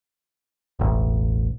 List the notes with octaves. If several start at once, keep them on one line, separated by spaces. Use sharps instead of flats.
E1 A1